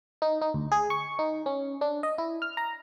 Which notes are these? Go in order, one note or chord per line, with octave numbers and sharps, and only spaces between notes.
D#4
D#4
D2
G#4
C#6
D#4
C#4
D4
D#5
E4
F6
A#5